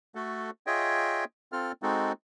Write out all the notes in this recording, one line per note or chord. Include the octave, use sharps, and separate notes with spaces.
A3 F#4 A4
F4 G#4 C#5 D#5 E5 G5
C4 F4 A4 F6
G#3 C4 D#4 F#4 A4